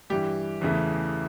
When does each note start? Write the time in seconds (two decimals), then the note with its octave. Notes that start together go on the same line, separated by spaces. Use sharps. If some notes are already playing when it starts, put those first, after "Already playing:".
0.10 G2 E3 G3 G4
0.61 E2 C#3 E3 A3